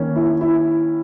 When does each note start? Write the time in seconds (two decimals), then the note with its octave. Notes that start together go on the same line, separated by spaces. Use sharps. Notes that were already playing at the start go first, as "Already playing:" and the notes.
Already playing: D#3 A#3 C#4
0.16 E4
0.41 E4